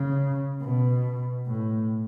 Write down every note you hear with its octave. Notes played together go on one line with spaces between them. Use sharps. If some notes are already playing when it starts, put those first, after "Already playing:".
Already playing: C#3
B2
A2